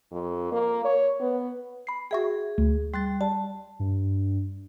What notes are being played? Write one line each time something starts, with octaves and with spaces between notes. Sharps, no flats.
F2
A#3
C#5
B3
B5 C7
F#4 G#4 E5 G5
D2
G3 C6 F#6 A6
G3 A5
G2